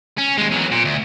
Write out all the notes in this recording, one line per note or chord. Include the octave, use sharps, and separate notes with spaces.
C#4
D#2 G#3
E2 F#3
A#2
D2